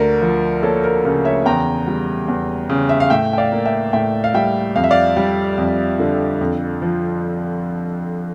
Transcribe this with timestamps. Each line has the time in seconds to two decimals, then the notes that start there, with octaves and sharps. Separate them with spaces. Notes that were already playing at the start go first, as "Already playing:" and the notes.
Already playing: D2 A#4 D5
0.21 F3
0.63 A#3 A4 C#5
0.84 A#4
1.05 C#3 A#4
1.25 C#5 E5
1.46 E2 G5 A#5
1.87 G3
2.28 E2
2.69 C#3
2.89 E5
3.00 F5
3.10 A2 E5 G5
3.33 G5
3.38 D5 F5
3.52 A#3
3.65 E5 G5
3.93 A2 E5 G5
4.24 F5
4.34 G3 E5 G5
4.76 F2 F5
4.84 E5
4.91 D5 F5
5.17 G3
5.58 F2
5.99 D3
6.41 F2
6.82 F3